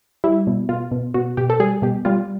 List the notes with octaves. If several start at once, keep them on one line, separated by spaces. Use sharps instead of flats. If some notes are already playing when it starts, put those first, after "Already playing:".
G3 E4
B2
B2 F4
B2
B2 F#4
B2 G4
A4
G3 G#4
B2 G4
G3 F4